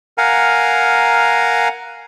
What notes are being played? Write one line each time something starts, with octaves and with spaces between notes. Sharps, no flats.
A#4 F5 F#5 G#5 A#5